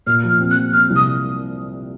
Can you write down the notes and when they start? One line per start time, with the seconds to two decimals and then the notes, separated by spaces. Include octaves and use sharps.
0.07 A#2 F6
0.24 F3
0.29 F6
0.40 C4
0.51 F#6
0.56 F3
0.73 C4 F6
0.90 C2
0.96 D#6